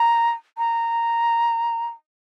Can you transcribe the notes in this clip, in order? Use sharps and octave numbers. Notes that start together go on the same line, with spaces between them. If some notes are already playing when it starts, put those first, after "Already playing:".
Already playing: A#5
A#5